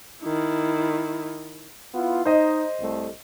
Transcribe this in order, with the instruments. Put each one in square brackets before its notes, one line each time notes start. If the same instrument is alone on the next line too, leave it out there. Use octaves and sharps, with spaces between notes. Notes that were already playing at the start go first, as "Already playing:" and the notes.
[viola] D#3 E4
[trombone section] B3 E4 F4
[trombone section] D#4 [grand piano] C5 D#5
[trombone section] C2 A3